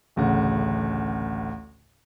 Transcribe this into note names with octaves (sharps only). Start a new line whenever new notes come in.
A1 D2 C#3 F#5